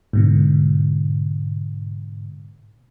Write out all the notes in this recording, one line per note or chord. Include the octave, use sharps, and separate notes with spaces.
G#2 B2 D3